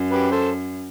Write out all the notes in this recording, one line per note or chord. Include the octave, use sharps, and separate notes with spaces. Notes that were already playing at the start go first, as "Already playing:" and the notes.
Already playing: F#2
G4 B4
A4 C5